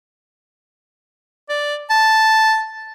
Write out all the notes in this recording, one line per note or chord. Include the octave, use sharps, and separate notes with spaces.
D5
A5